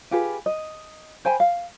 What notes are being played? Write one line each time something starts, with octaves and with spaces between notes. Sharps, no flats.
F4 G4 G#4 B4
D#5
C5 G5 G#5 B5
F5